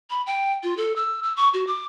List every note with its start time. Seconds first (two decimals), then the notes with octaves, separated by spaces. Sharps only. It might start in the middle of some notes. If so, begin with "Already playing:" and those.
0.10 B5
0.27 G5
0.63 F4
0.77 A4
0.96 E6
1.23 E6
1.37 C#6
1.54 F#4
1.67 D6